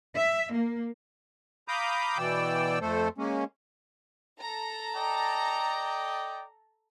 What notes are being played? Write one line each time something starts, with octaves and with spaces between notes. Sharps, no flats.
E5
A#3
F5 A#5 B5 D6 D#6 G6
B2 E3 D5 G5 E6
F2 A3 A4 C5
G#3 A#3 C#4
A4 A#5
D5 D#5 G5